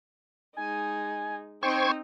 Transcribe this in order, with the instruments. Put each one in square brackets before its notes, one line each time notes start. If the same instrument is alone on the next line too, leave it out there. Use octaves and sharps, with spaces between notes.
[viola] G#3 D#4 [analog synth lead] G#5
[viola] C4 D#4 [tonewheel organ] C5 C#6 G#6 [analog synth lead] G5